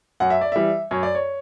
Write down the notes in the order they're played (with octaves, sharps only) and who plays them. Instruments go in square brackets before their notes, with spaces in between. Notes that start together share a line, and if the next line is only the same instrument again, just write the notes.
[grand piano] F#2 F#5
E5
D5
E3 G3 E5
F#2 C#5
D5
C#5